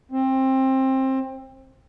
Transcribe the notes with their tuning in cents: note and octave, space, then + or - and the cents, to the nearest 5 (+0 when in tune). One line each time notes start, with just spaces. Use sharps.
C4 +20